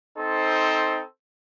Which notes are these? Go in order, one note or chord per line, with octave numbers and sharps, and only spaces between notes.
C4 D#4 A4 C5